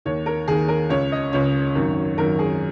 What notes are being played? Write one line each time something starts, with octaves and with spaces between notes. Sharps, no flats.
D#2 D#3 C#5
A#4
D#2 D#3 G#4
A#4
C#2 C#3 C#5
D#5
C#2 C#3 C#5
G#1 F#2 D#3
G#1 F#2 D#3 A#4
G#4